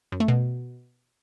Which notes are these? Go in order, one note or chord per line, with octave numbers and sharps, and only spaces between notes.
F#2
A3
B2